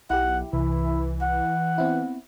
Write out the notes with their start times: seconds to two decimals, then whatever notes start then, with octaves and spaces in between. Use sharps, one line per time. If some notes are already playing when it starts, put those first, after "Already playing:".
0.10 B1 E4 G4 F#5
0.53 C2 E3 E4
1.22 F#5
1.78 B3 C4 E4